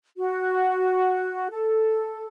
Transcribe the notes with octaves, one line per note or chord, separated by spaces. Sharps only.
F#4
A4